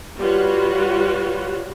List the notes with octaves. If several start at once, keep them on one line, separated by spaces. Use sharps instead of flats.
G3 F4 F#4 B4 C#5 F#5